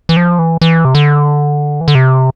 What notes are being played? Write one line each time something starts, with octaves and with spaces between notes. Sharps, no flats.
E3
F3
E3
E3
C3
D3
E3
D3
C3